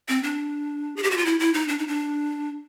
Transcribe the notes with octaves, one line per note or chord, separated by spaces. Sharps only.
C4
D4
G#4
G4
F#4
F4
E4
E4
D#4
D4
D#4
D4